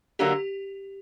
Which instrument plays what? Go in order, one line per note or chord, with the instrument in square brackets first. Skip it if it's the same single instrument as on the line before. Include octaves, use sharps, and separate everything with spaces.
[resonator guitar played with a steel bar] D3 F#3 A#3 [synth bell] G4